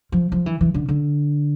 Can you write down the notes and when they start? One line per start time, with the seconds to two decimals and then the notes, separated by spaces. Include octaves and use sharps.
0.12 F3
0.32 F3
0.46 E3
0.61 E3
0.74 D3
0.88 D3